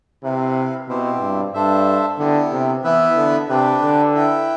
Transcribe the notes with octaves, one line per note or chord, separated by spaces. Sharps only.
C3 E4 B4 F5
B2 C4 E4 G4 C5
G2
G2 D4 A4 C5 E5
D3 B3 E4 G4
C3
E3 B3 E4 B4 E5
D3
C3 D4 G4 B4
D3
E4 B4 E5 G5